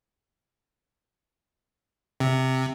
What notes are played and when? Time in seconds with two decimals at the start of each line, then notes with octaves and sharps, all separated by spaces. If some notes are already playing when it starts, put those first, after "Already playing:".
2.20 C3